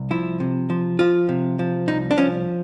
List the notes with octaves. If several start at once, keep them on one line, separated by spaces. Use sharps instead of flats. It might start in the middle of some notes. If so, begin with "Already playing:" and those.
Already playing: C2
F3 E4
C3
F3
F3 F4
C3
F3
C2 D#4
D4
F3 C#4